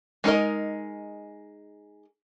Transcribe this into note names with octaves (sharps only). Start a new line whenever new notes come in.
G#3 D#4 A#4 D#5